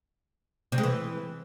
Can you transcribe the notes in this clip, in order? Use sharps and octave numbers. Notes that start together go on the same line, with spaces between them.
C3
G#3
E3